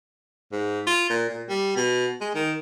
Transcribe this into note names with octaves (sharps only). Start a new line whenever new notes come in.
G#2
F4
A#2
A#2
G3
B2
G#3
D#3